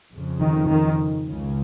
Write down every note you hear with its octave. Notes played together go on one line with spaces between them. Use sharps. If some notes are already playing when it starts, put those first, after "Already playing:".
F2 C#3
D#3
D#3
C#2 C#3